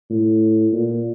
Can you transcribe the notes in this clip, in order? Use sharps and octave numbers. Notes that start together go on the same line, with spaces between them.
A2
A#2